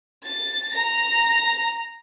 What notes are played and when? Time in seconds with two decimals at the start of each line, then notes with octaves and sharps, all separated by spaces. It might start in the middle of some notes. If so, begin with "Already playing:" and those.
0.24 A6
0.73 A#5 A#6